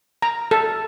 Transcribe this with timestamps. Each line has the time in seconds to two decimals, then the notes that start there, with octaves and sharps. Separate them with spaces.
0.22 A#5
0.51 A4